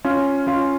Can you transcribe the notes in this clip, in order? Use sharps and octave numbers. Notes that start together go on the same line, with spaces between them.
C#4 F4
C#4 F4